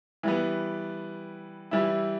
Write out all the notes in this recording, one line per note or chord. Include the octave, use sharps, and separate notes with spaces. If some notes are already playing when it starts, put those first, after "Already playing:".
E3 G3 B3
E3 G3 E4